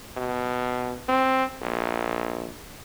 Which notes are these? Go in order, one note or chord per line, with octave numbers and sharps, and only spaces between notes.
B2
C4
A#1